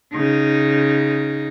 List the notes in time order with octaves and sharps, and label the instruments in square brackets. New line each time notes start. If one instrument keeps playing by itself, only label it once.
[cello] C#3 D#4